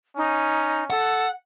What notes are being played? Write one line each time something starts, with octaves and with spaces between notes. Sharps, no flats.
C#4 D#4
A4 F#5